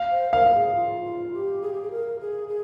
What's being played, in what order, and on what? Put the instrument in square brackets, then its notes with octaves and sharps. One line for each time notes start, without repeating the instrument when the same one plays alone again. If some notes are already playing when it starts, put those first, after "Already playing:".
Already playing: [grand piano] F5
[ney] C5
[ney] A#4 [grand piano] F5
[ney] G#4
F4
F4
G4
G#4
G4
G#4
A#4
G#4
G#4